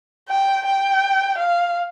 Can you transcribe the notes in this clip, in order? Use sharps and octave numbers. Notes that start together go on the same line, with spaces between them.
G5
G5
F5